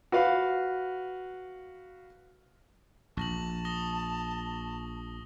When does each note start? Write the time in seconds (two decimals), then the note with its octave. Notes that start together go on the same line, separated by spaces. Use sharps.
0.12 F#4 B4 F5
3.17 A#1 A5 C#6 A#6 F#7
3.65 D#6 A#6 G7